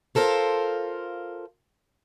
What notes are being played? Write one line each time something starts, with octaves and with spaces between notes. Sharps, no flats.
F4 A4 A#4 C5 F5